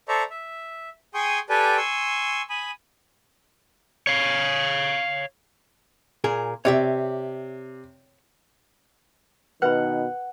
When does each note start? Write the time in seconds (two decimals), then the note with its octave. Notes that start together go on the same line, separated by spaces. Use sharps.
0.09 A4 C5 D5 E5 A#5 C#6
0.30 E5
1.14 G#4 G5 G#5 C6 C#6 D#6
1.50 G4 A4 B4 D5 G5 G#5
1.77 G#5 C6 C#6 E6
2.50 G#5 B5 D#6
4.07 C#5 F5
6.24 A#2 G#4 A#4
6.65 C3 C#5 D5 E5
9.62 B2 D#3 B4 E5 F#5 B5